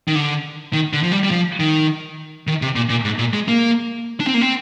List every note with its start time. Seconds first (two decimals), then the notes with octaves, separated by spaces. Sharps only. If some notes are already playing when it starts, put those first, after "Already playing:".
0.08 D#3
0.15 D3
0.73 D#3
0.93 D3
1.03 F3
1.12 G3
1.23 G3
1.31 F3
1.60 D#3
2.47 D#3
2.62 C3
2.76 A#2
2.90 A#2
3.04 G#2
3.19 A#2
3.33 G#3
3.48 A#3
4.20 D4
4.27 C4
4.34 A#3
4.41 C4